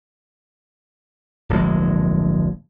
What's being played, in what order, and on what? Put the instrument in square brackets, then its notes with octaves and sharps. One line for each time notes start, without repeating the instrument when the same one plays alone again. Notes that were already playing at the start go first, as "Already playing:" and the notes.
[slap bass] D1 A#1 G2 G#3